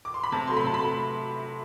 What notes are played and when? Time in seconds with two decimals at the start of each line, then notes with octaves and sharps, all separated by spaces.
0.05 D6
0.14 C6
0.24 B5
0.32 C3 A5
0.47 F#3 A3 C6
0.57 B5
0.64 C3 A5
0.74 B5
0.79 F#3 A3